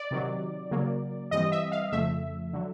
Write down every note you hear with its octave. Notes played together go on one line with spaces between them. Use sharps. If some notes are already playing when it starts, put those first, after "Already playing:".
Already playing: D5
C3 D#3 F#3
C#3 F#3 A#3
G2 E3 G3 C4 D#5
E5
F5
F2 C#3 F3 A3 E5
D3 F#3